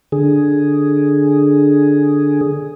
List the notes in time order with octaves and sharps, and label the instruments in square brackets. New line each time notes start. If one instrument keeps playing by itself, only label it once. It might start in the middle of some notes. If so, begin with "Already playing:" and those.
[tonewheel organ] D3 G#4